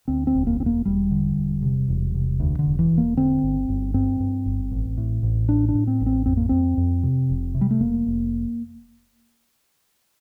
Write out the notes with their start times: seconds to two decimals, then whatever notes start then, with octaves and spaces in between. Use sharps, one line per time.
0.08 D2 C4
0.27 C4
0.34 E1
0.47 A#3
0.60 E1 C4
0.66 A#3
0.85 E1 G3
1.11 D3
1.37 E1
1.62 C3
1.88 E1
2.14 C3
2.40 D2
2.59 D3
2.65 E1
2.79 E3
2.91 E1
2.98 A#3
3.17 D3 C4
3.42 G1
3.68 G1
3.94 G2 C4
4.20 G2
4.46 G1
4.71 A1
4.97 A2
5.23 A1
5.48 A2 D4
5.69 D4
5.75 A2
5.87 C4
6.00 A1
6.06 C4
6.26 F2 C4
6.37 A#3
6.49 F2 C4
6.77 F2
7.03 C3
7.29 F1
7.55 C3
7.61 G3
7.71 A3
7.80 F1 A#3
8.06 F1